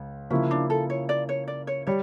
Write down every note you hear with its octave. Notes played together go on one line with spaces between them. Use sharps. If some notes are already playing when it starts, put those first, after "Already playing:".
Already playing: C#2
C#3 F3 A#3 C#4 E4
D4
A4
C#5
D5
C#5
D5
C#5
G3 C#5